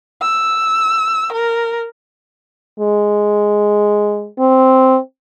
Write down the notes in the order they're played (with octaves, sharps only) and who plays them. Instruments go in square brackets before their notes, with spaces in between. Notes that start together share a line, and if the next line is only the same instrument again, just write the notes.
[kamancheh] E6
A#4
[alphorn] G#3
C4